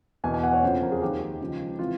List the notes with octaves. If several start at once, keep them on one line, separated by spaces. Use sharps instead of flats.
E2 B2 G#5
G#5
F#5
C#5
F2 C#3 F3 C5
A#4
G#4
D#2 D#3 G4
C#2 C#3 F3
C3 E3 F4